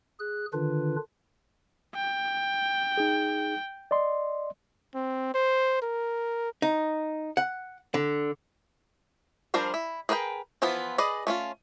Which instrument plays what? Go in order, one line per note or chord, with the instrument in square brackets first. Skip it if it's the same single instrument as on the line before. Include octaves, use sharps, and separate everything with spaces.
[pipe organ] G#4 F#6
D3 D#3 D4 F4 B4
[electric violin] G5
[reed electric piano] D#4 G#4
D5 D#5 C6
[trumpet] C4
C5
A#4
[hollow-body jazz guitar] D#4
F#5
D3
[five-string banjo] F3 G3 D4 A#4 C5
E4
G#4 A#4 B4 D#5 G5
E3 F3 B3 E4 F4
G#4 B4 D5 D#5
A3 C#4 F4